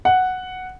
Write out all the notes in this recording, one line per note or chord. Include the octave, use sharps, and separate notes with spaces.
F#5